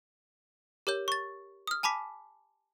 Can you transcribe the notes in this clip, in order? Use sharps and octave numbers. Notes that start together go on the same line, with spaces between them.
G4 A#4 C#5 G6
C#6 A6
D#6 F6
G#5 A5 B5 D6 B6